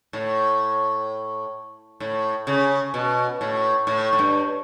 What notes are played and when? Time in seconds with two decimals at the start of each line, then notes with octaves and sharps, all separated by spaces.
0.13 A2
2.00 A2
2.47 C#3
2.94 B2
3.41 A2
3.87 A2
4.13 A2
4.19 G2